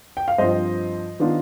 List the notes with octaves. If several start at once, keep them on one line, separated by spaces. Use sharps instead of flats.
G5
F5
G2 F3 C4 F4 C5 D#5
D#3 B3 D4 F4